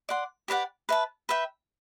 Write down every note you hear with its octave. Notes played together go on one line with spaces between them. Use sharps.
D5 F#5 C6
G4 B4 D5 F#5
B4 E5 A5
B4 E5 G5